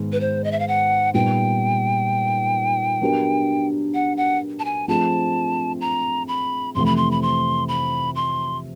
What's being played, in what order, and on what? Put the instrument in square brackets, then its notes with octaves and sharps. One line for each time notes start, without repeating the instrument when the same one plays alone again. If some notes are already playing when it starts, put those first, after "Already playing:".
Already playing: [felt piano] G#2 D#3 G#3 B3
[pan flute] B4
C5
D#5
E5
F5
F#5
[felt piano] A#2 G3 B3 D#4 [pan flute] G5
[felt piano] F#3 B3 D4 G4 A#4
[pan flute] F#5
F#5
A5
G#5
[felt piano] F3 A3 C4 F4 G#4 [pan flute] A5
[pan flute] A#5
B5
[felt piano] F2 C3 E3 A3 [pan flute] C6
[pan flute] B5
C6
B5
C6
B5
C6